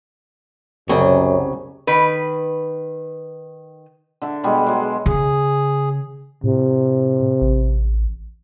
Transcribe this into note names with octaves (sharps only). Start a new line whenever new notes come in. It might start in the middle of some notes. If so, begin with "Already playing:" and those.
C2 F#2 C#3
D#3 B4
D3 E5 A5
B2 G3 G#3
F#3 G#3 D6
C#3 G#4
A2 C3
A1